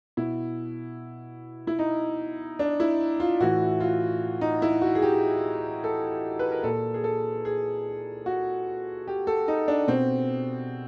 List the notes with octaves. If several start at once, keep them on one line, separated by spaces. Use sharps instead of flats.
B2 E4
E4
D#4
D4
E4
F4
A2 E3 F#4
F4
D#4
E4
F#4
G#4
G4
A4
B4
A#4
A#2 A4
G#4
A4
G#4
F#4
G4
A4
D#4
D4
B2 C4